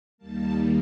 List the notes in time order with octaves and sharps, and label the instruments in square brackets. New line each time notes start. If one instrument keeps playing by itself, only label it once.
[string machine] D#2 D#3 G3 A#3 A5